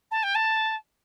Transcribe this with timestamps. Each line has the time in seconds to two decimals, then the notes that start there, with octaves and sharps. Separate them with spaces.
0.11 A5
0.23 G5
0.35 A5